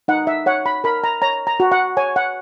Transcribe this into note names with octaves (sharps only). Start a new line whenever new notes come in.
D#4 F#5
E5
C#5 F#5
B5
A#4 B5
A#5
C#5 A#5
A#5
F#4
F#5
C#5 G#5
F#5